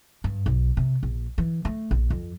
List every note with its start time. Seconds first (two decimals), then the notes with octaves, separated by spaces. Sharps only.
0.24 G2
0.46 B1
0.77 C3
1.03 A#1
1.38 E3
1.65 A3
1.91 A#1
2.10 F2